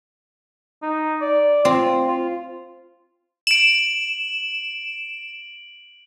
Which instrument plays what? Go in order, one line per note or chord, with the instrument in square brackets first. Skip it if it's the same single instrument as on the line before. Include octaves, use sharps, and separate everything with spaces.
[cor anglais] D#4
D5
[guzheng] C4 [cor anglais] F4
[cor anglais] F4
[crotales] D7 F#7 [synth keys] E7